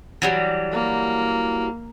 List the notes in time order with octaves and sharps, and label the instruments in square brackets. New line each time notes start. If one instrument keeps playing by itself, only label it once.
[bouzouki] E3 F#3 G3
[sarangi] A#3